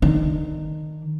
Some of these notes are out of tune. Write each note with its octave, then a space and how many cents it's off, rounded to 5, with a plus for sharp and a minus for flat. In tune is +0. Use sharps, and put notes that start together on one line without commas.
D#3 -15 D4 +0